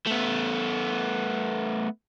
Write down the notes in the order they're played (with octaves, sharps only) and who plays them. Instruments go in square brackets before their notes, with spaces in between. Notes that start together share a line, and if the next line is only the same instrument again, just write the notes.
[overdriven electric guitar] A3 B3